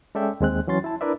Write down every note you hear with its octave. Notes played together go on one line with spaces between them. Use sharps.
G#3 C#4 A4 D5 E5 G5
D#2 G#3 C4 F#6
E3 F#3 C#4 C6 A6
E4 A5
D4 E4 A#4 B4 D5 E5